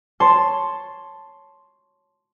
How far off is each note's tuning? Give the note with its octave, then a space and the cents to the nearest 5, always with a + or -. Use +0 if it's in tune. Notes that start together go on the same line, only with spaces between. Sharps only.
C#5 +0 A5 +0 C6 +0